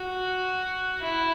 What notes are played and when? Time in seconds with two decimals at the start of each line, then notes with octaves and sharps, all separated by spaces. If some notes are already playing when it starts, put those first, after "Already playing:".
Already playing: F#4
1.01 E4